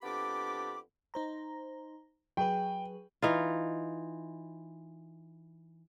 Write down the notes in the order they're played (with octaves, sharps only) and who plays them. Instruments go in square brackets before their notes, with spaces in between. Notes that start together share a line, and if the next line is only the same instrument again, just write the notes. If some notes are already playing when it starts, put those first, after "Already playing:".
[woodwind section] F2 B3 D4 G4 B5 D6
[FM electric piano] D#4 C5 A#5
[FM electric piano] F#3 G#4 B4 [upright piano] G5
[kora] E3 D#4 F4